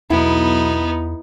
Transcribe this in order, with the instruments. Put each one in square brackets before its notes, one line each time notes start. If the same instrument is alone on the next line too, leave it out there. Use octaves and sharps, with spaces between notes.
[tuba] B1 [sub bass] E2 [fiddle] B3 D#4 [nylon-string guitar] E4